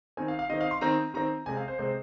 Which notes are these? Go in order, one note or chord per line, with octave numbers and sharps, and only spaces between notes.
D#3 C4 G#5
F5
F5
D#3 C4 D#5
F5
C6
D#3 C4 A#5
D#3 C4 A#5
C3 G#3 C4 G#5
F5
C5
C3 G#3 C4 C5